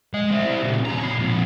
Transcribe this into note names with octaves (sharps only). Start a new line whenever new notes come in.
G#3 D#5
C4 E4
A#2 C#3
E2 A#5
C#5 B5
F2 A#2